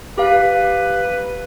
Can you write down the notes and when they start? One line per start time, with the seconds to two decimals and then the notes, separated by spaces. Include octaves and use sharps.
0.18 G4 B4 F5